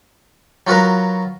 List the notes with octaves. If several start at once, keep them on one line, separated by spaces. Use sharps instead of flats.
F#3 F4 F#4 A#4 B4